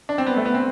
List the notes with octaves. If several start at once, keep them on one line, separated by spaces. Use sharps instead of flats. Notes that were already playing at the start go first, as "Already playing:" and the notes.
D4
C4
B3
A3
B3
C4